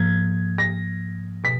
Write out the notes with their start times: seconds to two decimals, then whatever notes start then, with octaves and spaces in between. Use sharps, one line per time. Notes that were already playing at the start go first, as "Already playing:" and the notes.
Already playing: G#2 F3 A#3 G#6
0.58 A#6
1.44 B2 B6